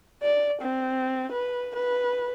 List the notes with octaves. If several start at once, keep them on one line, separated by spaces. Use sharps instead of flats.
D5
C4
B4
B4